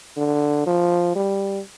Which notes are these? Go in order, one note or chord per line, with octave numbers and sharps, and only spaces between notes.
D3
F3
G3